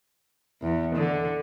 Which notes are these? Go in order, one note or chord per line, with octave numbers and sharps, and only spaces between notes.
E2
D3